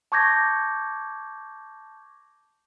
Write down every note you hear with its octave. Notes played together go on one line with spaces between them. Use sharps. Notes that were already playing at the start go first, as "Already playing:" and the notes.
A5 C#6 D6 G6 G#6 A#6